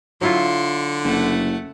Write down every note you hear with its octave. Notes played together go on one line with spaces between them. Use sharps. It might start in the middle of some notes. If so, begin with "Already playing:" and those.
D3 F#3 E4 F4 C6
F#1 A3 F#5